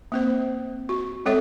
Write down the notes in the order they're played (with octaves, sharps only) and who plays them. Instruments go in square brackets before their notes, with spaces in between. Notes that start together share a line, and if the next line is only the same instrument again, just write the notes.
[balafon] A#3 C4 C5
F#4
G#3 C4 A4 C#5 E5